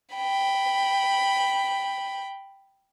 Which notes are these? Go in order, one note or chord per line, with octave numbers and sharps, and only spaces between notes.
G5 B5